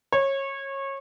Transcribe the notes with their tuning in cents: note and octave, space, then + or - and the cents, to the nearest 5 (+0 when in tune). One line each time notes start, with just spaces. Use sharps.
C#5 -25